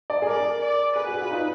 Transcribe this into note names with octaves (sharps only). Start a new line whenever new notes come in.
D5
G#4
A#4 D5
D5
G#4 B4
F#4
G#4
F4
D#4